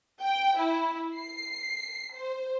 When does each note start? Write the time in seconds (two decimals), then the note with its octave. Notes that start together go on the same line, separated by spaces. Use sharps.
0.22 G5
0.57 E4
1.17 C7
2.14 C5